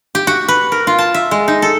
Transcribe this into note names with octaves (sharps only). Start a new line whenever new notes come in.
G4
F#4
B4
A#4
F4
A5
E5
G#3
D#4
A4